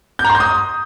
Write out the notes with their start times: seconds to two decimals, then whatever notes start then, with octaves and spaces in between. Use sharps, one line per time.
0.19 G6
0.24 A#5
0.30 C6
0.35 G6
0.40 D#6